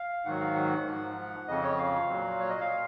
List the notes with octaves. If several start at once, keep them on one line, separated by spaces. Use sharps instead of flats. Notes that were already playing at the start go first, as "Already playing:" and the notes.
Already playing: F5
G#2 D#3 F#3 F#5
F5
F#5
G#2 F3
F2 C#3 F3 D#5
C#5
F5
A#2 F#3
C#5
D#5
F5
A#2